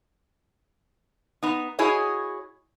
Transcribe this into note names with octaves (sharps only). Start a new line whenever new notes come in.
B3 D#4
E4 F#4 G#4 C#5 D#5